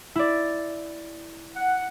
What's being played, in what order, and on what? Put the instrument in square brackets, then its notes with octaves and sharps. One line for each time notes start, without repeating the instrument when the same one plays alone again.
[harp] E4 D5
[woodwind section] F#5